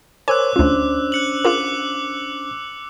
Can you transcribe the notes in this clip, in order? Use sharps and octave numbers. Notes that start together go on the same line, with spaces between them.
A#4 C5 C#5 G#5 D6 E6 F#6
D2 C#4 D4 F4 C5
F#6 C#7 F#7
F4 G#4 A#4 D6 F#6